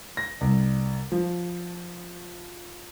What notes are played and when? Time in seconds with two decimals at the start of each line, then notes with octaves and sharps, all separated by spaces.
0.17 A#6
0.41 C2
1.12 F3